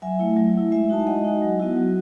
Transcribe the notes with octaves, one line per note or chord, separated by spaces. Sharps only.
F#3 E5 G#5
A3 E4
F#3
A3 E4
G#3 E5 G#5
D#4 F#4 A5
G#5
G#3 D#5 F#5
D#4 F#4
F#3
B3 E4 F#4
F#3